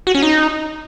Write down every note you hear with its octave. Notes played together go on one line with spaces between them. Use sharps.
F#4
C#4
D#4